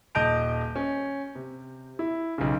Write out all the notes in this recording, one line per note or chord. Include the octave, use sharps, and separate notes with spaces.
D#1 D#5 A5 G6 D7 F7
C#4
C3
E4
B1 C#3